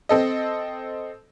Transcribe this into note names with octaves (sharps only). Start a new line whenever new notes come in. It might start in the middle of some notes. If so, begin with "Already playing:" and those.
C4 A4 D#5